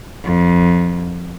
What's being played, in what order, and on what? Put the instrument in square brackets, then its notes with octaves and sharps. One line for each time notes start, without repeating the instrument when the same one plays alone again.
[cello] F2